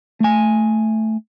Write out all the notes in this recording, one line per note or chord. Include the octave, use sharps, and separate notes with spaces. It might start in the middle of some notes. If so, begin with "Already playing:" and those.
A3 G#5